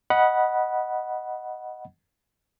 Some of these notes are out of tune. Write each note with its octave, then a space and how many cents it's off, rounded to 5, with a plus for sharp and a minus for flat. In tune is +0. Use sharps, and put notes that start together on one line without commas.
D#5 +0 F#5 +0 B5 -20